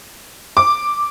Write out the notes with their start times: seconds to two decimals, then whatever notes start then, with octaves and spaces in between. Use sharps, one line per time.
0.57 D6